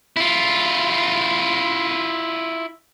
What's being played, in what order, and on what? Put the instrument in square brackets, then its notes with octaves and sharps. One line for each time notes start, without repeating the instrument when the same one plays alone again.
[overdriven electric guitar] E4 F4